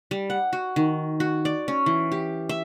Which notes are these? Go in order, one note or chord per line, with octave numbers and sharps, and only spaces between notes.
G3
F#5
F#4
D#3
F#4
D5
C#4
E3
G4
E5